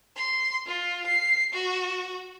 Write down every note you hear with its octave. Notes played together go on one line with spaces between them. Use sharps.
C6
F4
C7
F#4